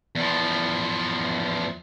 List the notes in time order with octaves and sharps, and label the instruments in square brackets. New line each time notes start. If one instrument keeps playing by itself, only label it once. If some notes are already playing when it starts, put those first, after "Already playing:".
[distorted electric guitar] E2 F3